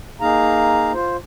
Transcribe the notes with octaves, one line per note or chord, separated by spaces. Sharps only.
A#3 D#4 G#4 F5 A#5
F4 C5